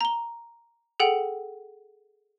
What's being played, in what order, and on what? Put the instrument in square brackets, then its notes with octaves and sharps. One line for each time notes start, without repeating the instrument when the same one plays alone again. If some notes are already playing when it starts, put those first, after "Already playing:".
[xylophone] A#5 G7
G#4 A4 F#5 G5